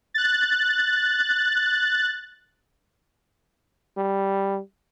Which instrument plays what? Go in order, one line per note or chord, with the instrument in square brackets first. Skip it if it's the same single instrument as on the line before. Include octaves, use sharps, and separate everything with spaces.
[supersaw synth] F#6 A6
[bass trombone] G3